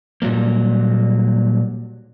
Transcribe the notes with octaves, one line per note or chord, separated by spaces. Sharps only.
A#2 F#3 G3 A#3